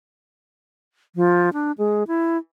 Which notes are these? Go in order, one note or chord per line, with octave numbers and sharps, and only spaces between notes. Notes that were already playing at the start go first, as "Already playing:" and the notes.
F3
D4
G#3
E4